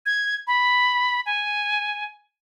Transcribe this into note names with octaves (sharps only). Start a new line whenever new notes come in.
G#6
B5
G#5